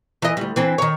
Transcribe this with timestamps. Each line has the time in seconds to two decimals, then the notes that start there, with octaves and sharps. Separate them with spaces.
0.22 E3 D#5
0.37 D2 G3
0.56 E3 C4 D4
0.78 D#3 C#5